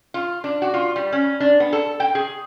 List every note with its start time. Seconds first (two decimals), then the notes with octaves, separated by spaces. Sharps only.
0.14 F4
0.44 D4
0.62 F#4
0.74 F4
0.96 G3
1.12 C#4
1.40 D4
1.60 B3
1.73 A4
2.00 G5
2.15 G#4